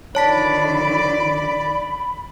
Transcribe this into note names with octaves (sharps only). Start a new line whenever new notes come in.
D3 D#3 F3 C#5 D5 A5 B5 B6